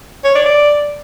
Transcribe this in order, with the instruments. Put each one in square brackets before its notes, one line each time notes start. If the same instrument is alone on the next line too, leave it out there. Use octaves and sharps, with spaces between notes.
[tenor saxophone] C#5
D5
D5